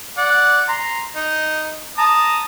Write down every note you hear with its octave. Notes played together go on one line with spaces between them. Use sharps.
D5 F#5
A#5 C6
D#4
A5 A#5 D#6